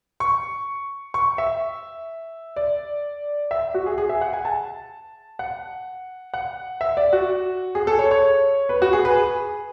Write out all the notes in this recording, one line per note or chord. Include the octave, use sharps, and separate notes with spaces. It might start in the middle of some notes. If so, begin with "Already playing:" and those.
C#6
C#6
E5
D5
E5
F#4
G#4
G#4
E5
F#5
G#5
A5
F#5
F#5
E5
D5
F#4
G#4
A4
C#5
C#5
B4
F#4
G#4
B4
G#4